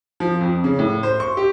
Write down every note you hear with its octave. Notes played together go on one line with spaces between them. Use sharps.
F3
F2
C#3
A2
C5
C#6
G4